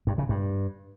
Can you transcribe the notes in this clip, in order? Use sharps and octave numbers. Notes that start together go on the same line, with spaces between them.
G2
C#3
G2